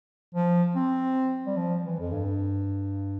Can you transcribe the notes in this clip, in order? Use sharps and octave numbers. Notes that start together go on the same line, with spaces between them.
F3
C4
G3
F3
E3
F2
G2